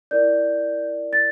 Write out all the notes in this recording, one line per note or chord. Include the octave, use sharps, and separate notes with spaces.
E4 A#4 D5 G6
A6